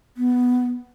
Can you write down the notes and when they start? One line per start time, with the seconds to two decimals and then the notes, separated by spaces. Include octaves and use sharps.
0.17 B3